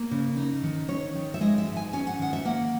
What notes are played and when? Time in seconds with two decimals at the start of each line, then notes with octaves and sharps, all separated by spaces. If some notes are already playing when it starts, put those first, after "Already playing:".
Already playing: A#3
0.11 C#3
0.37 D#4
0.64 D#3
0.88 C#4 C#5
1.15 D#3
1.34 E5
1.41 G#3 D#5
1.58 E5
1.67 G#2
1.76 G#5
1.93 C#4 G#5
2.07 F#5
2.19 D#3 F#5
2.33 E5
2.45 A#3 F#5